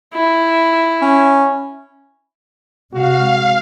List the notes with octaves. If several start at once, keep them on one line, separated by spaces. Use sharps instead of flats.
E4
C#4
C3 G#3 F#4 F5